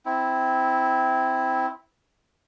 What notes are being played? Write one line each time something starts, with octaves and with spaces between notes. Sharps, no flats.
C4 E4